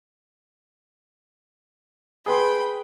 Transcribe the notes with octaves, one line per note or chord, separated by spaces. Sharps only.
G#4 B4 G5 B5 C6